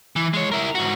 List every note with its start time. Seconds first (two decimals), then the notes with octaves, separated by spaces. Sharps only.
0.16 E3
0.34 G#3 C#5
0.52 E4 A#4
0.75 G#2 F#4